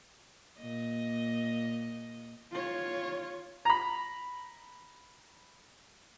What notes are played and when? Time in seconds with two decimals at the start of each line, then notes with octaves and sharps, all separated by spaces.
0.59 A#2 D#5
2.52 F4 C#5
3.65 A#5 B5